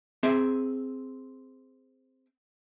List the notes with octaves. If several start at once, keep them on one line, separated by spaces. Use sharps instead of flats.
C4 G#4 E5